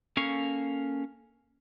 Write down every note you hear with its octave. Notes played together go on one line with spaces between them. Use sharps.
A#3 C#4 A4 F5 C#6